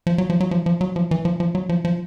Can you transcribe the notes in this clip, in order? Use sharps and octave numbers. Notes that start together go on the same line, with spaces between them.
F3
F#3
F3
F#3
F3
F3
F#3
F3
E3
F3
F3
F#3
F3
F3